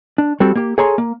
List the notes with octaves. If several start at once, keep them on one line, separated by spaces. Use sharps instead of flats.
D4
G3 C4 F#4 A4
A#3 G4
G#4 A4 C#5 G#5 A#5 C6
A#3